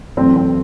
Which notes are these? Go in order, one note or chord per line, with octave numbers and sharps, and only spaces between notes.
F#2 E3 A3 C4
C4